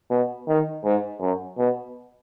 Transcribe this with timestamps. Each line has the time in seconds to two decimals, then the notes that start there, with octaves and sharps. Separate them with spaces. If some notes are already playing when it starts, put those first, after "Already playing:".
0.11 B2
0.48 D#3
0.84 G#2
1.21 F#2
1.58 B2